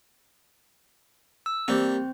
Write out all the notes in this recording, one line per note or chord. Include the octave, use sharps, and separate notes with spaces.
E6
G3 A#3 C4 C5